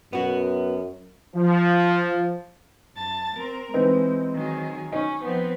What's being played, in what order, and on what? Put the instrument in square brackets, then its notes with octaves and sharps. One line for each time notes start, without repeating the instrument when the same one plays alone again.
[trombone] F#2 [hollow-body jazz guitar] B3 F#4
[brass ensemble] F3
[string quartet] F#2 A5 A6
C4 A#4
[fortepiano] E3 C4 D#4 [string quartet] G#3
[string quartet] D#3 F#3 G#4
[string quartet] C#4 [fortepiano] D#4
[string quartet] F3 B3 C4